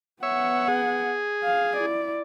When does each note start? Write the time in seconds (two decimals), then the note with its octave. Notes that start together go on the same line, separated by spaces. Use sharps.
0.23 B3 C#5 E5 F#5
0.68 G#4
1.45 F5
1.76 E4 D5